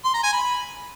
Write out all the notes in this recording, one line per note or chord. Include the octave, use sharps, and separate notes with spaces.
C6
A#5
G#5
B5